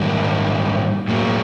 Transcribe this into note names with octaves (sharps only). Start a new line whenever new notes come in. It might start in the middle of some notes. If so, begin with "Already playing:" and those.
Already playing: G#2 D#3 G3 A#3
A2 F#3 A#3